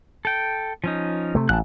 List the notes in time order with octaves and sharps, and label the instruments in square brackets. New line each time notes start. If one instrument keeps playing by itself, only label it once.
[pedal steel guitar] A4 G5
F3 C#4 D#4
[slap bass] C3 A3
[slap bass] A1 [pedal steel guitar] A5 F#6